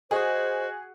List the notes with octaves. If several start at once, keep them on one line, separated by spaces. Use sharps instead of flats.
F#4 G#4 C5 D#5